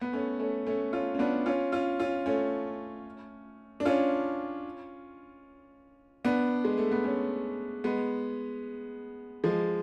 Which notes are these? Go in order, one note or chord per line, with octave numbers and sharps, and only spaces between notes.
B3
A3 C#4
A3 C#4
A3 C#4
C#4 F4
C#4
B3 D4
C#4 F4
C#4 F4
C#4 F4
A3 C#4
D4
C#4 F4
B3 D4
G#3
A3
B3
A3 C#4
G#3 B3
F3 G#3